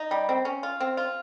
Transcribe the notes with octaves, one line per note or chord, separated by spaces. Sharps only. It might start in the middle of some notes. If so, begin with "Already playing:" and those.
Already playing: D#4
G3
C4
C#4
F4
C4
F4